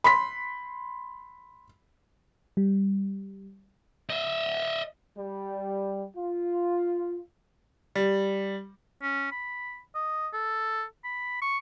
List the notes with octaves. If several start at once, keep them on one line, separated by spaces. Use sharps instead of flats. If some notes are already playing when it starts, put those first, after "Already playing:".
B5 C6 B6
G3
D#5 E5
G3
F4
G3
C#4
B5
D#5
A4
B5
C#6